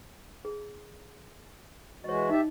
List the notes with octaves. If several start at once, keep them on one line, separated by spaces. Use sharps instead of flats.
G#4
E3 G#3 F#4 C#5 D#5
D#4 G4 D#5 E5